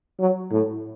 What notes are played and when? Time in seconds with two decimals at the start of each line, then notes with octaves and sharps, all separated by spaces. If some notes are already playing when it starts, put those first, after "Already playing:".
0.20 F#3
0.52 A2